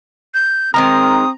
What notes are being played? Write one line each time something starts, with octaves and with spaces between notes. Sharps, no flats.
G6
D#3 G#3 C4 A#4 A#5 D#6